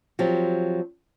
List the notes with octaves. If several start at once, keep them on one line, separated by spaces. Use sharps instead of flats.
F3 F#3 C4 G4